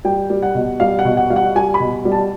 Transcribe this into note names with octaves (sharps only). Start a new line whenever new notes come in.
G3 G5
G3
F#5
B2
G3 F5
F#5
B2
F#5
G3 F5
F#5
G3 G#5
B5
B2
G3
A5